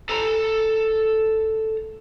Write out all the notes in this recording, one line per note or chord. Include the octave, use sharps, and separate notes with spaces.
A4 A#5